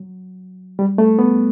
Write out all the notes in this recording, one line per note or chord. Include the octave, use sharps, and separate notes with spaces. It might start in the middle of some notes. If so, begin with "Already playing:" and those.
Already playing: F#3
G3
A3
B3